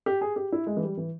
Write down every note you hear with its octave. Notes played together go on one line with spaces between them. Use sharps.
G4
G#4
G4
E4
G#3
E3
G3
E3